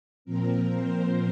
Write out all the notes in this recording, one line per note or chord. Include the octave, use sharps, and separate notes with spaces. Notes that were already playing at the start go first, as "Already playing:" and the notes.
A#2 F3 C4 A#4
C5